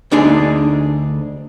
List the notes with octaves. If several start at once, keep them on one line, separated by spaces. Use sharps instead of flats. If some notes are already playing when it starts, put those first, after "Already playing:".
D2 D3 D4 D#4 G#4